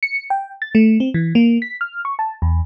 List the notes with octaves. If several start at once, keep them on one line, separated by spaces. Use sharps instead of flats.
C#7
G5
A6
A3
C4
E3
A#3
B6
F6
C#6
A5
E2